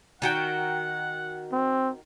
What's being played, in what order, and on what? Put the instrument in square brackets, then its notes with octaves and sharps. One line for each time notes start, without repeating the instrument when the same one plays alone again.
[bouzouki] D#3 F#4 G5 [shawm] F#5
[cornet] C4